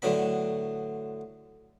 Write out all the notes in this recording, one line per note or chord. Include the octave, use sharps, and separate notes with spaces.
A2 D3 F#3 B3 B5